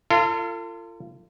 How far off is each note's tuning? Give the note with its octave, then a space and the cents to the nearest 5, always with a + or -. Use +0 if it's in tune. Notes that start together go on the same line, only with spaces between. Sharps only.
F4 -30 A4 +40